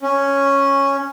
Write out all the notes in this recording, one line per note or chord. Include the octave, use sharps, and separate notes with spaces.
C#4